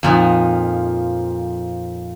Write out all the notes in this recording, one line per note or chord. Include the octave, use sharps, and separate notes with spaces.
F2 A#2 F3 D#4